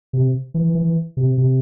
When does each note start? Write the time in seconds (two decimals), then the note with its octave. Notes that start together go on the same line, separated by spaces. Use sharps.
0.13 C3
0.54 E3
0.75 E3
1.17 C3
1.38 C3